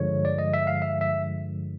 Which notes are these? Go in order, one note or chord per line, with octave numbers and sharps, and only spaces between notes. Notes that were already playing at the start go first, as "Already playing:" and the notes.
Already playing: G2 D3 F3 G#3 C#5
D5
D#5
E5
F5
E5
E5